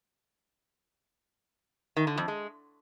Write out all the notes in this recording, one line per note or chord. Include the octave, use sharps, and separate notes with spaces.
D#3
D3
F2
G#3